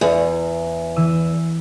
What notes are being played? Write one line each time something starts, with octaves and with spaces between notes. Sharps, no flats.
E2
E3 E6 D#7